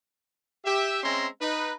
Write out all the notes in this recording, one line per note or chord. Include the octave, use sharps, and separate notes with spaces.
G4 E5
G#3 C4 C#4 E5 A#5 C6
D#4 B4